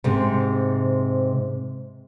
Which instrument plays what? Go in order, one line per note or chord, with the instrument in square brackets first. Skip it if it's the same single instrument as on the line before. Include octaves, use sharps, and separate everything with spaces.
[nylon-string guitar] G#2 C3